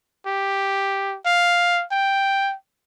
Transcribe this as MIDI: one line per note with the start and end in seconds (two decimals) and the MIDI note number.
0.26 1.17 67
1.26 1.84 77
1.91 2.54 79